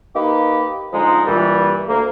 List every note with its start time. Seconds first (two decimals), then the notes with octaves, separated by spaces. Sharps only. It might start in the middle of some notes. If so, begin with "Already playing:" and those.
0.15 A#3 D#4 G4 B4
0.93 D3 F3 G#3 D#4
1.26 G2 A#2 E3 G3
1.88 D2 A3 A#3